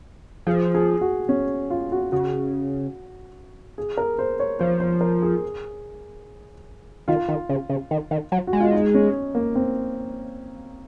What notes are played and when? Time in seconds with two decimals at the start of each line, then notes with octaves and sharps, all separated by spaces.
0.47 F3 G#4
0.75 G#4
1.01 F#4
1.29 C#4
1.70 F4
1.92 F#4
2.12 C#3 F#4
3.78 G#4
3.97 A#4
4.19 C5
4.40 C#5
4.59 F3 C5
4.80 C5
5.01 A#4
5.22 G#4
7.08 D#3 F4
7.28 D#3
7.49 C#3
7.69 C#3
7.91 D#3
8.11 D#3
8.32 F#3
8.47 F#4
8.53 G#3
8.60 F4
8.73 D#4
8.94 C#4
9.35 A#3
9.55 C4